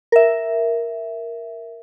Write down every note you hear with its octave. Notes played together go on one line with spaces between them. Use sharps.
A#4 E5